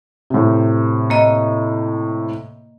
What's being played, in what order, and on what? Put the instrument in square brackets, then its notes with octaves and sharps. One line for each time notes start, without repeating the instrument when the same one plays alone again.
[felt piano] A2 C3
[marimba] A#3 D#5